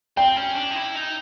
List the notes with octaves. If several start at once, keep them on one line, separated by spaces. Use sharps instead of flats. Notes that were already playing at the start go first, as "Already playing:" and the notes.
C4 G5
C#4
D4
D#4
E4
D#4